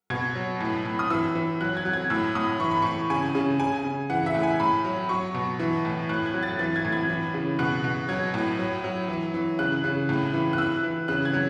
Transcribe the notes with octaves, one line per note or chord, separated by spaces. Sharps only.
B2 G#6
F#3
A2
A2
D#6
E3 E6
E3
F#3 F#6
G#6
F#3
G#6
A2 E6
A2 D#6
E3 C#6
B5
A2 C#6
C#3 G#5
C#3
C#3 G#5
C#3
E3 F#5
E5
A2
G#5
A2 B5
F#3
F#3 C#6
B2
E3
A2
A2 F#6
G#6
F#3
A6
E3 A6
G#6
A2
G#6
E3
C#3
B2 F#6
B2
F#3 G#6
A2
F#3
F#3
E3
E3
C#3 F#6
C#3
A2
E3
F#6
E3 E6
E3
C#3 F#6
G#6
F#3